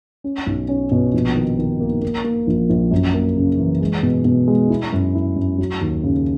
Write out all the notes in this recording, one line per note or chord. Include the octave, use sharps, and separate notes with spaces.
C#4
B1
C#4
B2
A#1
D#3
D#3
A#3
A#3
A#3
A#1
A#1
F#2
A#3
C#3
E3
G#3
B2
B2
G#3
E4
F#2
E4
F#2
F#3
D#2
C#3